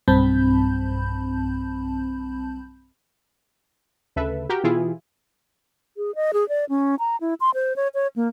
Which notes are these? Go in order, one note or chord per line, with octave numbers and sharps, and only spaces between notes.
B1 G2 C4 A5 B5 G6
D2 C#3 A4 B4 E5
F#4 G4 A#4 G5
B2 E3 E4 F4 G4 G#4
G#4
D#5
G#4
D5
C#4
A#5
E4
C6
C5
C#5
C#5
A#3